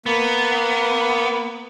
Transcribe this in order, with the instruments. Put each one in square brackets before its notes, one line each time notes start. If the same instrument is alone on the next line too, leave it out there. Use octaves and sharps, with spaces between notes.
[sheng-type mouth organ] A#3 [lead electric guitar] B3